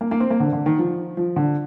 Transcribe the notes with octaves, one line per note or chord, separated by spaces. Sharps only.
A#3
A#3
C4
A#3
D3
D3
D#3
F3
F3
D3